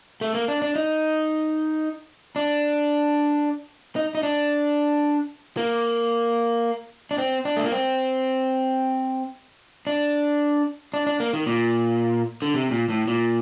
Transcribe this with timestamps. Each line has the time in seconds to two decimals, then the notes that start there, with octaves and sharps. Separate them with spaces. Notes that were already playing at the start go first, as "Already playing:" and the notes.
0.21 A3
0.35 A#3
0.48 D4
0.62 D4
0.76 D#4
2.36 D4
3.96 D#4
4.15 D#4
4.23 D4
5.57 A#3
7.11 D4
7.18 C4
7.45 D4
7.57 A3
7.64 A#3
7.72 C4
9.87 D4
10.94 D4
11.07 D4
11.20 A#3
11.33 D#3
11.46 A#2
12.42 D3
12.54 C3
12.71 A#2
12.90 A2
13.08 A#2